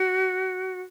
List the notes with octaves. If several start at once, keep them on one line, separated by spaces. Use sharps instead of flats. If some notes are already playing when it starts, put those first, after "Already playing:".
Already playing: F#4